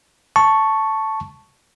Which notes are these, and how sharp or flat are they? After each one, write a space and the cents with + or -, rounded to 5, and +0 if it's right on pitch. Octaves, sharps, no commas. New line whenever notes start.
A5 +0 C#6 +0